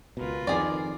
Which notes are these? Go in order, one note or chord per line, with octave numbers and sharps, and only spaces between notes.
C#2 B2 F4 A#4 B4
F2 D#3 G#4 D5